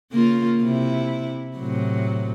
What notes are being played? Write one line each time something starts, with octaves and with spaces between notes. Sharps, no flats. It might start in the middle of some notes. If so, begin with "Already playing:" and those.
C#3 A#3 F4
C3 E4
A2 C3 F#3